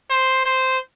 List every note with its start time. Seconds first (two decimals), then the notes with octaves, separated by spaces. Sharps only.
0.10 C5
0.46 C5